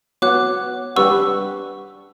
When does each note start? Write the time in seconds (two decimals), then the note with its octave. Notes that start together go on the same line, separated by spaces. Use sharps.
0.22 B3 F#4 C#5 F#5 D6 F#6
0.96 G3 D4 G4 B4 F#5 C#6 E6